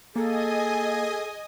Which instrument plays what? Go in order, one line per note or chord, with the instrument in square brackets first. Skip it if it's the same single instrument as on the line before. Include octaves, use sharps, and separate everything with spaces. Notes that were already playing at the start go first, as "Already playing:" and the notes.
[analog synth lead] A#3 [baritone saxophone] G#4 [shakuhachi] A4 [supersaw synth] D#5 G#5 D#6